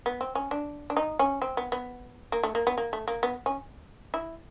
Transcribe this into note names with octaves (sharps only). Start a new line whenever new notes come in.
B3
C4
C#4
D4
D4
D#4
C#4
C4
B3
B3
A#3
A3
A#3
B3
A#3
A3
A#3
B3
C#4
E4